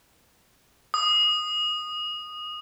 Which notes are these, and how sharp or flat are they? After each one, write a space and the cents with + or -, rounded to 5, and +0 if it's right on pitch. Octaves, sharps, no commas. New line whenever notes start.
D#6 -10